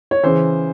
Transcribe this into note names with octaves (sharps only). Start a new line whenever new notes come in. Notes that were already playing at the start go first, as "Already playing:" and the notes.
C#5
C#3 E3 C5